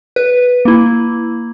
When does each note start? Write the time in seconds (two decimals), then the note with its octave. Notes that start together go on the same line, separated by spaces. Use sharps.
0.16 B4
0.65 A#3 E4